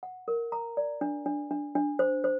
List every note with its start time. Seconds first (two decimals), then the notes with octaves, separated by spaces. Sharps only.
0.03 F#5
0.28 A#4
0.52 A#5
0.77 D5
1.01 D4
1.26 D4
1.51 D4
1.75 D4
1.99 C5
2.24 C5